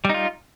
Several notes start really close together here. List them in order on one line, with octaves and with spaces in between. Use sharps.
G3 D#4 F4